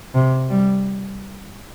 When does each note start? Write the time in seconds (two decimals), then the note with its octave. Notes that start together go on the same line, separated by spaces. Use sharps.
0.14 C3
0.50 G3